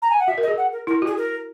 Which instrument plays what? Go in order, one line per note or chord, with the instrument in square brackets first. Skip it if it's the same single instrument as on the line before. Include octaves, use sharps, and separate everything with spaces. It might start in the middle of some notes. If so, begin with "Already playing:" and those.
[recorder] A#5
G#5
F#5
[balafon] F#4 [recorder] E5
[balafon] A#4
[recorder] D#5
[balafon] G#4
[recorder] F#5
A#4
[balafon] E4 [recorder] A#4
[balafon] F#4 [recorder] G#4
[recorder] A#4